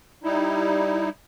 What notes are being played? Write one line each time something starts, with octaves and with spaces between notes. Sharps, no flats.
G3 D#4 E4